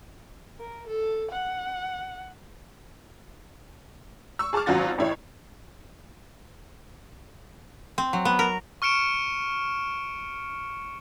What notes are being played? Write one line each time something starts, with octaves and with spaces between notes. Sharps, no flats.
A#4
A4
F#5
C#6 E6
G#4 A5 C#6 D6 F6
G#1 F#3 C#4 F4 F#4 A6
A1 E4 C#5
C4
F#3
B3
A#4
C#6 F6 C#7 D7 E7